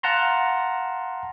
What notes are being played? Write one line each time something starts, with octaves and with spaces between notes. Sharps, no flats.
F5 F#5 A5 A#5 C6